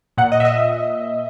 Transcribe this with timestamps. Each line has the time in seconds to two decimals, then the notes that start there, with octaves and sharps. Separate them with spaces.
0.17 A#2 F#5
0.32 D#5
0.40 E5
0.45 D#5